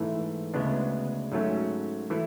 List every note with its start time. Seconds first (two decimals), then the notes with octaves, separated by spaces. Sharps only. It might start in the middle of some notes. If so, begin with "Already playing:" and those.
Already playing: G#2 E3 A3 E4
0.54 D2 C#3 G#3 B3 D4
1.32 G#2 F#3 A3 C#4
2.10 E3 A3 E4